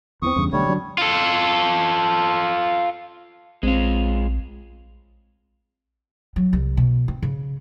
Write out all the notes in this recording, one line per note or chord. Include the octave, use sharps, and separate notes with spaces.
E2 E3 C4 C#6 D#6
E2 G2 C#3
B1 D3 G3 A3 C#5
D3 F#3 D4
F4 A4
A#1 G#3 C4 F4
F#3
C2
B2
C4
C#3